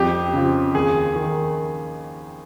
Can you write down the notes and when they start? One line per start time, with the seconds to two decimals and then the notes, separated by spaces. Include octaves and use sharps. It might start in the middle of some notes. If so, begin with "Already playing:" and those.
Already playing: F2 G4
0.33 C#3 F3
0.74 D#2 G#4
1.16 D#3